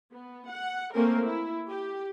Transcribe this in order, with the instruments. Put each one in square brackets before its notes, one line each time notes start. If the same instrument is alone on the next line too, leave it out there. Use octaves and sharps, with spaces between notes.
[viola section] B3
F#5
A3 A#3 C4 C#4 A#4
E4
G4